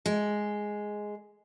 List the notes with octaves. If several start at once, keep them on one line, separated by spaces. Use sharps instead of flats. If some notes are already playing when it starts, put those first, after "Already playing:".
G#3